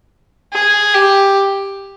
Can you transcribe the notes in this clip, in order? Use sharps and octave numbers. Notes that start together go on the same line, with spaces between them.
G#4
G4